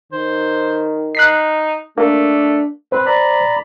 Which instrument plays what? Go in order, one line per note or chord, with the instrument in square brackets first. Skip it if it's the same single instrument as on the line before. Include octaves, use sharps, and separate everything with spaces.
[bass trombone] D#3 [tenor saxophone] C5
[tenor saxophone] D#4 [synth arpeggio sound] F#6 B6 C7
[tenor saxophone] A3 [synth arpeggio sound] A#3 [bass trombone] D4
[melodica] C4 B4 [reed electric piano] C5
[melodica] D5 A#5 B5